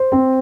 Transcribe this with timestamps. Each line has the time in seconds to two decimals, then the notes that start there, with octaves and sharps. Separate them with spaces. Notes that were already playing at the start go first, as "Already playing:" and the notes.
Already playing: C5
0.12 C4